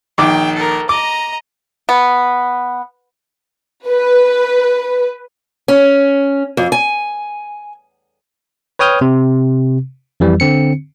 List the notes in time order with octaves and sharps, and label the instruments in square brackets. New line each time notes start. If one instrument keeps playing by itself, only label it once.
[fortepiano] A#1 D#3 D6 [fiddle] G5
[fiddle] A4 A#4
[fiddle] D#5 A#5 [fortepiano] D6
[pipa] B3
[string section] B4
[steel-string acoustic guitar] C#4
F2
G#5
[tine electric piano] B4 C#5 G5 D#6 F6 G6
C3
F2 E3 G3
D3 C4 C#7